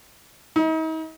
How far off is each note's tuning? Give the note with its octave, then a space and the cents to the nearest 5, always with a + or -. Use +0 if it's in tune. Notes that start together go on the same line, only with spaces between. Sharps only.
D#4 +40